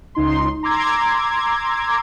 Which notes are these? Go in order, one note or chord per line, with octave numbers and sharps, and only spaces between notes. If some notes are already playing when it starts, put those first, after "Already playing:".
C#2 D#4 C6
A#5 C6 D6 E6 G#6